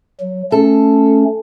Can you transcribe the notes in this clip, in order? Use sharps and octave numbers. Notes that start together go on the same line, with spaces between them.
F#3
A3 C#4 A4